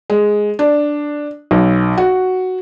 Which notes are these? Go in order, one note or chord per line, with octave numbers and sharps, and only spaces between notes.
G#3
D4
B1
F#4